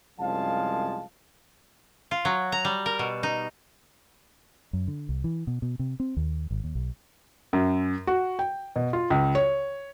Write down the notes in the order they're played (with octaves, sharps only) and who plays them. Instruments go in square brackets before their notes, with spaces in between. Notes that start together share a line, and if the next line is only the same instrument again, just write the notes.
[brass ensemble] C2 F#2 F3 G#3 F5 A5
[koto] F4
F#3
A#5
G3
A#4
B2
D#4
[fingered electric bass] F#2
D3
C2
E3
B2
B2
C3
C4
D#2
G#1
D#2
B1
[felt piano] F#2
F#4
G5
B2
F4
C#2
C#5